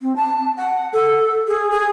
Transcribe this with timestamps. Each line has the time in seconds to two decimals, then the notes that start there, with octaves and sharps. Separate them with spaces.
0.02 C4
0.16 A5
0.57 F#5
0.93 A4
1.47 G#4
1.71 G#4